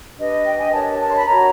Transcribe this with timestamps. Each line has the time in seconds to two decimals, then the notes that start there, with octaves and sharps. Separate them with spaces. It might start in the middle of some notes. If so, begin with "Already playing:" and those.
0.18 D4 G4 B4 D#5
0.46 G5
0.59 G#5
0.72 D4 G4 A#4 C#5 A5
0.99 A5
1.08 C6
1.17 B5
1.25 F#4 A#4 C#5 A#5